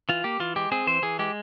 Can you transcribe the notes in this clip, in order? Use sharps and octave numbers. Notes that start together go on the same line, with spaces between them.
E3 F4
A#3 G4
E3 F4
G#3 G4
C4 G#4
E3 C5
E3 G#4
G#3 G4